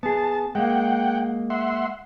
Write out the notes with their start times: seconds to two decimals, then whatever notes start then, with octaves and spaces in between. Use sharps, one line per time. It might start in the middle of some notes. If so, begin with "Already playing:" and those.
0.03 B3 G#4 A5
0.55 G#3 A#3 F#5 G5
1.50 E5 F#5 C6